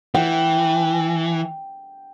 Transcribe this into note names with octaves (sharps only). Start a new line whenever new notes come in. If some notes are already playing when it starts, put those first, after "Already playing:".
E3 G5